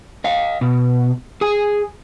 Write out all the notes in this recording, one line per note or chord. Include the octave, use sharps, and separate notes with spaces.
D#5 F5
B2
G#4 G#5